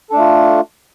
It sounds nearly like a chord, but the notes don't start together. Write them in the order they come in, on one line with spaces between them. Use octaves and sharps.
A4 D4 A3 F4